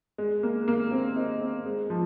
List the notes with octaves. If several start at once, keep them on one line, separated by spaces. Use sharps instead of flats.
G#3
A#3
A#3
C4
D#4
C4
G#3
F3